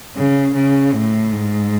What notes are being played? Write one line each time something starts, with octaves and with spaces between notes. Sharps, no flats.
C#3
C#3
A2
G#2